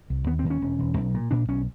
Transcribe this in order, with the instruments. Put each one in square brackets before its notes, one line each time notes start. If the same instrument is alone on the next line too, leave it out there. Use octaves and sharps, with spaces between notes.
[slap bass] C2
D#2 B3
C4
D#2
C#4
E1
E1
B1
A#2
A#2 D4
B1 C#4